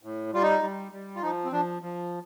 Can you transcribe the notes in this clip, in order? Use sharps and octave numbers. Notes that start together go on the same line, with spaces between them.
A2
G3 F4
D#4
G3
G3
F4
F3 D#4
C4
F3 D4
F3